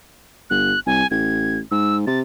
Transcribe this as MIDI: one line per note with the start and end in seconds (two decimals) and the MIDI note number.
0.50 0.74 31
0.50 0.80 90
0.86 1.03 36
0.86 1.07 80
1.11 1.60 33
1.11 1.59 92
1.71 2.05 44
1.71 1.96 88
2.07 2.22 48
2.07 2.19 93